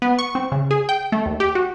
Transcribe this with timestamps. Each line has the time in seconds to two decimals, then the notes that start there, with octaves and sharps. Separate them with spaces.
0.02 B3
0.19 C#6
0.35 C4
0.52 C#3
0.71 G#4
0.89 G5
1.12 A3
1.26 D#2
1.40 G4
1.55 F#4